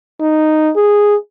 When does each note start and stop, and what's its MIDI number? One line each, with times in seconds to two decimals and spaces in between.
0.20 0.71 63
0.76 1.15 68